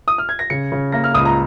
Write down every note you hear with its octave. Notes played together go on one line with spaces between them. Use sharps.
D#6
F6
G#6
A#6
C#3 C#7
C#3
A#3 A#6
F6
C#2 D#6
A#5